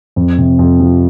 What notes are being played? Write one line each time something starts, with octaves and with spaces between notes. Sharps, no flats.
F2
C3
F2
F3